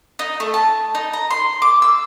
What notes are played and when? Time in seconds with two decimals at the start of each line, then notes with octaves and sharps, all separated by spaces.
0.19 D#4
0.40 A3
0.54 A5
0.95 D#4
1.13 A#5
1.31 C6
1.62 D6
1.82 E6